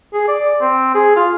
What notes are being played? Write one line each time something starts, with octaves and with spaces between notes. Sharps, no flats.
G#4
D5
C4
G#4
F4